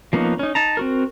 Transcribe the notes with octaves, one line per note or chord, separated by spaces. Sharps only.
F3 A#3 B3 C#4 D#4
C#4 D#4
D#4 A5 A#5
C4 F#4 A#4